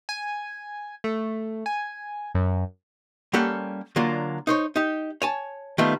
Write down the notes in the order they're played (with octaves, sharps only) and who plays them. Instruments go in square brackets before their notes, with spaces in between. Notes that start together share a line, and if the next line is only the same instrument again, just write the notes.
[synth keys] G#5
A3
G#5
F#2
[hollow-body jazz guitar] G3 A#3 C#4 G4 A4 F#5
D3 F#3 A#3 D4 F4
D#4 C5 C#5
D#4 G4
C#5 G#5 A5
D#3 G3 A3 B3 F4